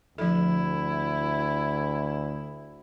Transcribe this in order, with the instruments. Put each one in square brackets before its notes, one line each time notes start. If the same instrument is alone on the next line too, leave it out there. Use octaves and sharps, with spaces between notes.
[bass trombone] D2 [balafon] F3 A4 [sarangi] E4